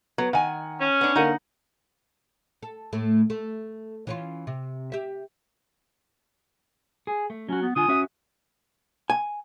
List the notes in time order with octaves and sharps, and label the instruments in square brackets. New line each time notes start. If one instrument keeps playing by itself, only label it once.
[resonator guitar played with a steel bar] F#3 [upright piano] B3
[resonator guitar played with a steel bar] D#3 G#5 [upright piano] F#5
[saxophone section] C#4
[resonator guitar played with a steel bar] B3 D4
[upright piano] D3 A#3 [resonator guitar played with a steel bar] D#4 F#5
[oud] A4
A2 A3
A3
E3 C#4 F4
C3
G4 E5
[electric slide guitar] G#4
A3
[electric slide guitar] F#3 F#4 [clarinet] C#4
[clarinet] B3
[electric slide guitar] D3 F4 G#5 [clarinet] D#6
[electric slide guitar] C#4 F#4 E5
[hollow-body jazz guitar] G#5